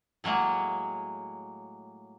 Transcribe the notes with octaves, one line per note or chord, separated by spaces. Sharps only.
A2 F#3 G#3 A#3